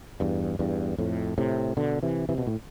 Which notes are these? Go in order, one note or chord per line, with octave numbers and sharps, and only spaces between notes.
E2 G2
E2 G2
F2 A2
A2 C3
B2 D3
C3 E3
C3 E3
B2
A2